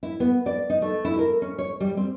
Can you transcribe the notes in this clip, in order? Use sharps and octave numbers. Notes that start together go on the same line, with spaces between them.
E4
B3
D5
D#4
A3
E4
A#4
C#4
C#5
G3
C4